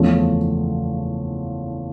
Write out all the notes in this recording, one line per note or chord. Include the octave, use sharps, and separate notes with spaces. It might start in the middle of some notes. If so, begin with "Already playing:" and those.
Already playing: F#1 E2 C#3 F3 A3